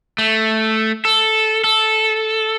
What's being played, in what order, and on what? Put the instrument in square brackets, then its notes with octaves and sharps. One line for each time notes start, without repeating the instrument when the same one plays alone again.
[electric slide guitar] A3
A4
A4